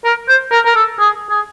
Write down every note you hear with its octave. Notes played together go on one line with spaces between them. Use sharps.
A#4
C5
A#4
A#4
A4
G#4
G#4